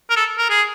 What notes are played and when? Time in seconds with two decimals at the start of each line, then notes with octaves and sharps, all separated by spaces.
0.10 A#4
0.16 A4
0.38 A#4
0.50 G#4